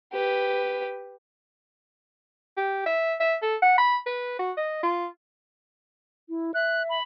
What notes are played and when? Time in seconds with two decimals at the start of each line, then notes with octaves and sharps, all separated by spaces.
0.13 G4 B4
2.57 G4
2.86 E5
3.20 E5
3.42 A4
3.62 F#5
3.78 B5
4.06 B4
4.39 F#4
4.57 D#5
4.83 F4
6.29 E4
6.54 E5 F#6
6.89 B5